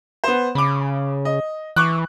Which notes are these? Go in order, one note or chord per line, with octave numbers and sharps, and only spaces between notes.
B3 C5
C#3 B5 D6
D#5
E3 C#6 D6 F#6